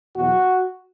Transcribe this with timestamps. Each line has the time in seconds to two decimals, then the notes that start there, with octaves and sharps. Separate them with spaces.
0.15 E2 B2 F#3 F#4